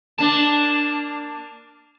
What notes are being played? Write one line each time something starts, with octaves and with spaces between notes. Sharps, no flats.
A#3 D4 A5